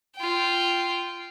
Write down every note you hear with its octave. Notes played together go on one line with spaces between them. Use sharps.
F4 G5